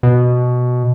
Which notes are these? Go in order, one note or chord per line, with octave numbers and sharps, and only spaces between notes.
B2